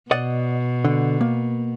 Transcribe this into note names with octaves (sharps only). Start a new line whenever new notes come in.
B2 D5 D#5 F#5
D3
A#3